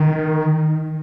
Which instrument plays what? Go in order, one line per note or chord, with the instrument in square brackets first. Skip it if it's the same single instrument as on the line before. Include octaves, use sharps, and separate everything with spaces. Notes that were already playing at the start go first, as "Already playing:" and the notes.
Already playing: [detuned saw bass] D#3